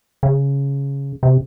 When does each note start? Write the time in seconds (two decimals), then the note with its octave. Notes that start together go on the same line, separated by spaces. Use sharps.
0.23 C#3
1.23 C3